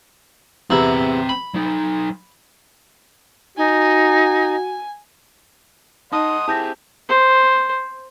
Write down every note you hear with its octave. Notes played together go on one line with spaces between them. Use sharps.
E2 C3 C4 E4 A#5
B5
F#3 D#4
D#4 F#4 G#5
D#4 D#5 F#5 A5 C6 D#6
C4 E4 G4 G#4 A5 G6 A#6
C5